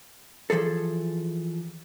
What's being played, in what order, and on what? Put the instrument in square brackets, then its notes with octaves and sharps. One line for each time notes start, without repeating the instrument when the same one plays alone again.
[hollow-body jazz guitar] E3 F3 G#4 A4